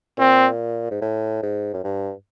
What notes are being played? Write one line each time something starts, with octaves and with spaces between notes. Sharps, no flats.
A#2 C4
G#2
A2
G#2
F#2
G2